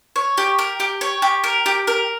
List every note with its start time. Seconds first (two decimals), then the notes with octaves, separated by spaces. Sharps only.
0.16 C#5
0.38 G4
0.59 A#4
0.80 G4
1.01 C#5
1.22 G4
1.44 A#4
1.66 G4
1.87 A#4